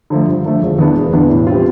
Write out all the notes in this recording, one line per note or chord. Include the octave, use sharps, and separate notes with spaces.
D3 F3 A3
G2
D3 F3 A3
E1
E2 B2 B3 D4
E1
E2 B2 B3 D4
A2
G3 C4 F4